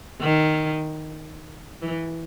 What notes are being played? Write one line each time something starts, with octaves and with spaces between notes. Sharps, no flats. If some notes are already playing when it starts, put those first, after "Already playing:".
D#3
E3